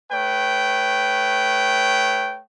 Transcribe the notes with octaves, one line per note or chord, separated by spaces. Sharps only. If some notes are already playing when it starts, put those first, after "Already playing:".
A3 B4 C#5 G5